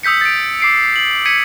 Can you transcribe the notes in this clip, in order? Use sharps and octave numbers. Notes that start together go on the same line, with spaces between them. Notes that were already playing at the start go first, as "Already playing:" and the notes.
D#6 E6 G6 B6 C#7
A6 D7
D6 C7 D7
F#7
G#6 B6 C#7 D#7